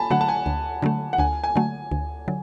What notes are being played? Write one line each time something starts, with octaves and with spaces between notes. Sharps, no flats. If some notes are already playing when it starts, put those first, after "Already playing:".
Already playing: G#5 A5 B5
D3 F#3 A3 F#5
A5
G#5
D2
D3 F#3 A3
F#5
D2 G#5
G#5
D3 F#3 A3
D2
D3 F#3